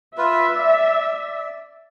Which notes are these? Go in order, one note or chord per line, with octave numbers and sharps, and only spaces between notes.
F4 B4 E5
D5